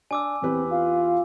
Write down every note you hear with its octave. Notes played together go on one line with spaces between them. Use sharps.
D4 G#5 D6 E6
E2 C4 G4 B4
F4 F5